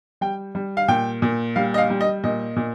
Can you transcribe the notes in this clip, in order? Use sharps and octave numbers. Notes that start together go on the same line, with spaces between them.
G3 G5
G3
F5
A#2 G5
A#2
G3 F5
D#5
F5
G3
D#5
A#2 D#5
A#2